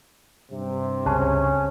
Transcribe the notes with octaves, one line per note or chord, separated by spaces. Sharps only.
G2 C3
C#2 C#4 G#4 C5 A5